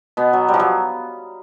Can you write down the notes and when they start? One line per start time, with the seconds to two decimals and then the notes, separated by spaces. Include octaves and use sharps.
0.17 B2 B3
0.33 F#3
0.48 G3
0.54 F3
0.60 F#3